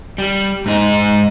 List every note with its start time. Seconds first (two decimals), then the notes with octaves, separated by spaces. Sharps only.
0.18 G3
0.66 G#2 D#4